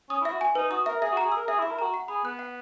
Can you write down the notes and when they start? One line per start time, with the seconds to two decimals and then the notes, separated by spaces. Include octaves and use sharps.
0.10 C#4 D#6
0.21 E4
0.25 E5
0.32 F#4
0.41 G#5
0.55 D#4 B4
0.71 F#4 D#6
0.86 A#4 E5
1.01 G#4 E5
1.13 F#4
1.17 A#5
1.25 G#4
1.32 A#4 E6
1.47 G#4 E5
1.59 E4
1.62 E5
1.70 A#4
1.79 F#4 A#5
1.94 F#5
2.08 G#4 B5
2.24 B3 F#6
2.39 F#5